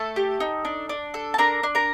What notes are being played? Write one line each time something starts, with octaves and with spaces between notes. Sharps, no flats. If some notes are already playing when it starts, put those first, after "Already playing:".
Already playing: A3 A4 A5
G4
D#4
D4
D4
A4
A5
D4 A#4 A#5
D4
A#4 A#5